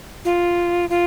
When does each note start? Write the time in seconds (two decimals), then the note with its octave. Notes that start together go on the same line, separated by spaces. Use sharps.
0.25 F4
0.90 F4